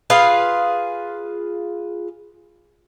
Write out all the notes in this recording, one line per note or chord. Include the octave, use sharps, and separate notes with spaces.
F4 G#4 B4 F5